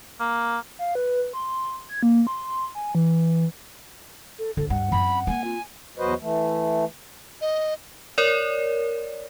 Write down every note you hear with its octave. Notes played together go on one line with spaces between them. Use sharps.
A#3
F5
B4
C6
G#6
A#3
C6
G#5
E3
A4
D2 A4
G2 F#5
F#2 C4 B5
A#3 C4 G#5
F4
E2 F#3 F#4 B4 C5 D#5
E3 A3
D#5
A#4 C#5 D5